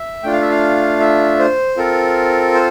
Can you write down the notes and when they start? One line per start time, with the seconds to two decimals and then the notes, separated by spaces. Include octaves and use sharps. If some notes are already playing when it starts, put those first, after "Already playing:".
Already playing: E5
0.23 A3 D4 F4 G5
0.33 F5
0.41 E5
0.50 F5
1.00 E5
1.39 C5
1.77 C4 F4 A4 A#4
2.54 C5